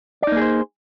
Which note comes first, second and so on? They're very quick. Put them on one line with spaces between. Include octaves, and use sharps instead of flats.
D5 D#4 A#3 G#4 C5